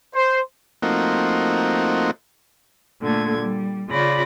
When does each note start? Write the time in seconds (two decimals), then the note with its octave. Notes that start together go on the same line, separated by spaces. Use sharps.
0.14 C5
0.82 F3 A3 A#3 C4 D#4 F#4
3.00 A#2 D3 A3 G#6
3.37 G3
3.89 C#3 F4 D5 B5 A#6